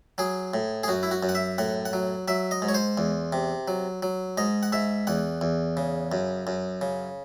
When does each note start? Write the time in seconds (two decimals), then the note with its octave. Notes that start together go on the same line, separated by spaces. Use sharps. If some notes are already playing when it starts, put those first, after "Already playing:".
0.18 F#3 G#4
0.54 A2
0.83 G#4
0.88 F#2 F#4
1.03 E4
1.11 F#4
1.23 F#2
1.29 F#5
1.35 E5
1.58 A2 F#5
1.85 F#5
1.93 F#3
2.28 F#3 E5
2.51 D#5
2.62 G#2
2.69 C#5
2.74 C5
2.98 E2
3.33 C3
3.68 F#3
4.03 F#3
4.37 G#2 D#5
4.63 F#5
4.72 G#2 E5
5.07 E2 F#5
5.41 E2
5.77 C#3
6.12 F#2
6.47 F#2
6.81 C#3